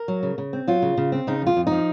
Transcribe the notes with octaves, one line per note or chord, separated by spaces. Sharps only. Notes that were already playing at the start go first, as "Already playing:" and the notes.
Already playing: A#4
F#3
C#3
C#3
C4
F#3 F4
C#3
C#3
C4
C#3 D#4
F2 F4
F2
D#4
F3